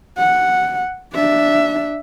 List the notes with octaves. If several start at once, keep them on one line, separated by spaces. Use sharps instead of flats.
F#5
D4 E5